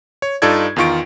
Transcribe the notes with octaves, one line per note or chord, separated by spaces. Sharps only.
C#5
G2 D#4 F4 A4 D5 G#6
E2 D#3 F4 C#6 D7